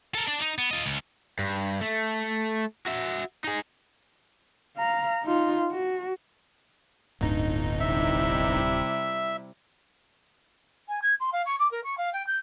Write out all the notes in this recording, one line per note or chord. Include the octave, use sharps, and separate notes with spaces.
A4 A#4
D4 D5
D#4
B3
F4 D#5
C#2
G2
A3
F#4 E5
D#4 G#4
F5 A#5
D#4 F4
F#4
D1 G1 D#4
C3 G3 E4 E5
G#5
G#6
C6
F5
C#6
D6
A#4
C#6
F5
G5
G6